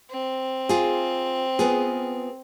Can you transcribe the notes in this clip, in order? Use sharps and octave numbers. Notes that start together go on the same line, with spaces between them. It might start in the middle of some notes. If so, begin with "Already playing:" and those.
C4
F4 G#4
B3 F4 G#4